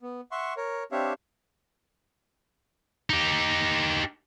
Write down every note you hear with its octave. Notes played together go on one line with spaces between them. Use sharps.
B3
E5 F#5 C6 C#6
A#4 C#5
C4 D4 G4 C#5 E5 F5
D#4 G4